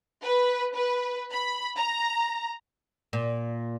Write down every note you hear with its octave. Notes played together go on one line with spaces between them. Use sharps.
B4
B4
B5
A#5
A#2